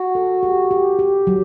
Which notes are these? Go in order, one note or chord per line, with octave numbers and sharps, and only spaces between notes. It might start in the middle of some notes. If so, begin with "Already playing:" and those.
Already playing: F#4
A4
G4
G4
G4
F#3